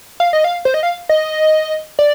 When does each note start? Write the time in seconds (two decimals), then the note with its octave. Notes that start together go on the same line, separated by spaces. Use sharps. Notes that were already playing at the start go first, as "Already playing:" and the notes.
0.20 F5
0.33 D#5
0.44 F5
0.65 C5
0.74 D#5
0.83 F5
1.09 D#5
1.99 D5